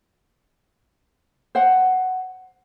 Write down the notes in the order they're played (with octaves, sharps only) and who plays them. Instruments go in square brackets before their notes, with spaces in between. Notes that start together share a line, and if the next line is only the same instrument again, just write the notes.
[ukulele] C5 F#5